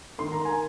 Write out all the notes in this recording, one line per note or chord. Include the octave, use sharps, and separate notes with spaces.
D#3 A#3 C6
A#5
G#5